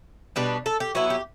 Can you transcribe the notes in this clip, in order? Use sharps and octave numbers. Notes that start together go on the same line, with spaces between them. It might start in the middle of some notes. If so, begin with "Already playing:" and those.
B2 G3 D4 B4
A4
G4
F#3 B3 E4 F#4
G4